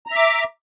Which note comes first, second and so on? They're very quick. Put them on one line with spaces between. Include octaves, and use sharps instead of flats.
A#5 E5 D6